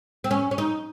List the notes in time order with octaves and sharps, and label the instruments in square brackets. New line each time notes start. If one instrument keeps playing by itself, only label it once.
[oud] C4
C#4
C#4
D#4